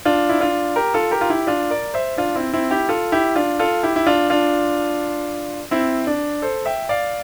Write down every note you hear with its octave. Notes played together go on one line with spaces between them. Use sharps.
D4 F4
E4
D4 F4
G4 A#4
F4 A4
G4 A#4
F4
E4 G4
D4 F4
A#4 D5
C5 E5
D4 F4
C4 E4
C4 E4
E4 G4
F4 A4
E4 G4
D4 F4
F4 A4
E4 G4
E4
D4 F4
D4 F4
C4 E4
D4
A4 C5
E5 G5
D5 F5